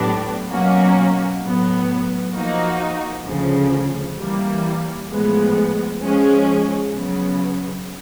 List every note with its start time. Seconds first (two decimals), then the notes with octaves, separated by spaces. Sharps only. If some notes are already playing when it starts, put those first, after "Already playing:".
Already playing: A2 F#3 B3 D4 G4
0.50 B2 F#3 A#3 C#4 F#4
1.42 A2 F#3 B3
2.34 F3 A#3 D#4 F#4
3.26 D2 C#3 F3
4.18 E3 G3 A#3
5.10 A2 F3 G#3 B3
6.02 F3 G#3 C#4
6.94 C#3 F#3 B3